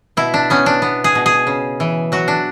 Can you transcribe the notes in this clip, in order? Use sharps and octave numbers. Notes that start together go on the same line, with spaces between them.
B2 E4
D4
B3 C#4
D4
B3
G#4
B2
G#4
C#3
E3
F#3 F#4
D4